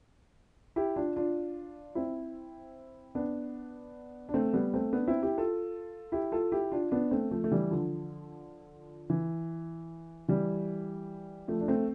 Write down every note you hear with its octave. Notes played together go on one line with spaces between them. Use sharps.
E4 G4
D4 F4
D4 F4
C4 E4
B3 D4
D4
A3 C4
G3 B3
A3 C4
B3 D4
C4 E4
E4 G4
F4 A4
E4 G4
F4 A4
E4 G4
D4 F4
B3 D4
A3 C4
F3 A3
A3
E3 G3
D3 F3
E3
E3 G3
F3 A3
D4
A3 C4